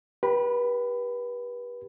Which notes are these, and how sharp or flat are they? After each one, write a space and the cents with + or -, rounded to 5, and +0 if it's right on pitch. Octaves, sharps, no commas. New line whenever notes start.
G4 +0 B4 -35 B5 +20